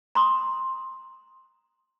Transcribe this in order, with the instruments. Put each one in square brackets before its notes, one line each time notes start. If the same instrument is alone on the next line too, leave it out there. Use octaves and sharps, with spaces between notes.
[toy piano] A#5 C6 D#6